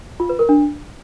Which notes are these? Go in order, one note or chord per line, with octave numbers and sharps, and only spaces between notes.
F4
B4
A#4
D4